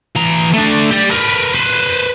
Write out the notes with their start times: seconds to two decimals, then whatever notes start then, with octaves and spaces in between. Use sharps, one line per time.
0.16 E3 A#5
0.54 A3 D4
0.91 G4 D5
1.11 A#4 B4
1.55 B4 C5